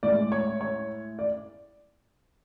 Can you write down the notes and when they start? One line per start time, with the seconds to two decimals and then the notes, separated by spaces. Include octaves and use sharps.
0.03 A2 G#3 D5
0.32 C#5
0.61 C#5
1.19 D5